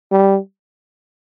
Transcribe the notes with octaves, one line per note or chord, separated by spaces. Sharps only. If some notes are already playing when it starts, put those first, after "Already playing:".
G3